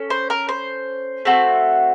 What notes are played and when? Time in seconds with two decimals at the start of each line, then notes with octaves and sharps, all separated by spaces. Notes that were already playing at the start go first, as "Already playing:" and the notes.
Already playing: C#4 A4
0.10 C5
0.30 A#4
0.49 C5
1.25 A3 C4 F#4 A4